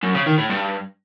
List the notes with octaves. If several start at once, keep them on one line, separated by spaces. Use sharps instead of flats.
F#2
C#3
D#3
A2
G2